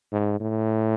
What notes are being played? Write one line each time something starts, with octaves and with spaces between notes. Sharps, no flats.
G#2
A2